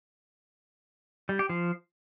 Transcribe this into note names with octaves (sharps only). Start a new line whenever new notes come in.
G3
G4
F3